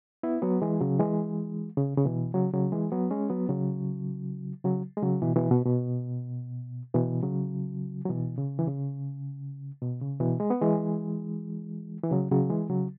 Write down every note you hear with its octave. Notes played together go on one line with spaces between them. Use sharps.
B3 E4
F#3 B3
E3 G#3
C#3 F#3
E3 G#3
C#3
C#3
B2 E3
C#3 F#3
C#3 F#3
E3 G#3
F#3 B3
G#3 C#4
F#3 B3
C#3 F#3
C#3 F#3
G#3
C#3 F#3
B2 E3
B2 E3
B2
B2
B2 E3
C#3 F#3
F#3
B2 E3
C#3
E3
C#3
B2
C#3
B2 E3
G#3
B3
E3 G#3
E3
C#3 F#3
C#3 F#3
E3 G#3
C#3 F#3